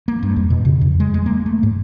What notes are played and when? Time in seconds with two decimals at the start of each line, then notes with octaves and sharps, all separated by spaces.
0.08 A#3
0.23 G2
0.36 F2
0.50 B2
0.65 C#3
0.81 F2
1.00 G#3
1.14 G#3
1.26 A#3
1.46 A3
1.63 G#2